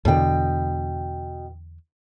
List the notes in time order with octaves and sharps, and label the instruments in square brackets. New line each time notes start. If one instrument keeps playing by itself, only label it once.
[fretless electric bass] E2 D3 [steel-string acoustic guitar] B2 G5